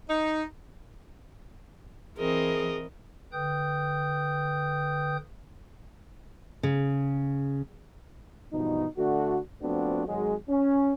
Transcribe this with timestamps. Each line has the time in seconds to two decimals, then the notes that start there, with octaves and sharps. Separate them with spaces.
0.09 D#4
2.17 E3 C4 G#4 A#4 D#5
3.33 D3 B4 G5 D#6 G6
6.63 C#3
8.53 G2 B2 E3 F3 D#4
8.97 D3 A3 D4 F#4
9.62 F3 A3 B3 C4 D4 F#4
10.07 G#1 F#3 G#3
10.49 C#4